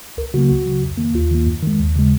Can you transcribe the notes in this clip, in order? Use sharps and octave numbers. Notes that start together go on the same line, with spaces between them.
C#2 A#4
C#3 F#3 A#3 F#4
C#2 F#4
C#3 F#3
F2
D#3 A#3
D#2 F4
D#3 A#3
F#2
D#3 G#3
D#2
C#3 G#3